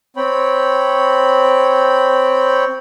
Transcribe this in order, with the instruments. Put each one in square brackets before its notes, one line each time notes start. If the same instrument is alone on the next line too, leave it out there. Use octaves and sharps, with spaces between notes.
[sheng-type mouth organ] C4 C#5 G5 B5